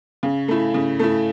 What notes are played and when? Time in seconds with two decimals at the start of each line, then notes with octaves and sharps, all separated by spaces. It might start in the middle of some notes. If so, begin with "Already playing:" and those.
0.23 C#3
0.48 A3 E4
0.74 C#3
0.99 A3 E4